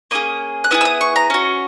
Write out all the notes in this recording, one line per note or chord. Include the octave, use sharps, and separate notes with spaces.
A#3 C#4 G#4 D#6
F#6
B3 E4 G#4 E6
E6
D#6
C#6
A#5
C#4 F#4